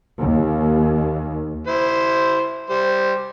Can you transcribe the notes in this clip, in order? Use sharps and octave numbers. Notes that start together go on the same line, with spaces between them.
D#2
E4 C5
G3 C5